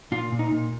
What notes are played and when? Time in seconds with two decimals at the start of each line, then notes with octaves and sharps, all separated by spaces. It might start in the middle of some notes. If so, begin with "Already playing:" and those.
0.12 A#2 F4
0.32 A#2
0.39 D#4
0.52 A#2